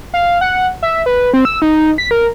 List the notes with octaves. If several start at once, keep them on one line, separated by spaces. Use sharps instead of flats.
F5
F#5
E5
B4
C4
E6
D#4
B6
A#4